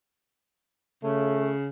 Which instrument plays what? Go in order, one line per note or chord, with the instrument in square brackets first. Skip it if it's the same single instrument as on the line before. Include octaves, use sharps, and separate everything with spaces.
[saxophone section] C#3 [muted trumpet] A3